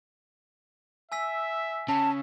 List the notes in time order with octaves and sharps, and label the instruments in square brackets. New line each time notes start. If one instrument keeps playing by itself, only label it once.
[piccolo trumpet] E5 [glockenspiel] G#5 E6 B6
[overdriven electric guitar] C#3 [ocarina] A5